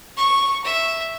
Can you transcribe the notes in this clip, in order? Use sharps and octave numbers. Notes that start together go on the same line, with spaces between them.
C#6
E5